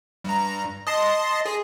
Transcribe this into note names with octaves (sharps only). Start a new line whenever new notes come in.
G2 A#5
D#5 A5 C6
G#4